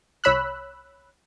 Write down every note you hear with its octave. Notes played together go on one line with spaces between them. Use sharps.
C2 C#5 B5 E6 F#6